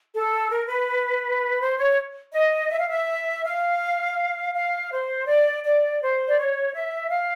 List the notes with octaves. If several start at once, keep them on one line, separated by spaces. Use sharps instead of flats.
A4
A#4
B4
C5
C#5
D#5
E5
F5
E5
F5
F5
C5
D5
D5
C5
D5
C#5
E5
F5